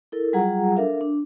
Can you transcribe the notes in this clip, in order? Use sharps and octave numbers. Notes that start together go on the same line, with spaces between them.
E4 A4 A#4
F#3 G3 F4 G#4 F#5 A#5
D4 A4 A#4 E5 F5
D4